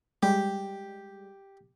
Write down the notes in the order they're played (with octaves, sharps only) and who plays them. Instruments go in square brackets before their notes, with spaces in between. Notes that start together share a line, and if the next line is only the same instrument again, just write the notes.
[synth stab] G3 G#3 [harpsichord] G4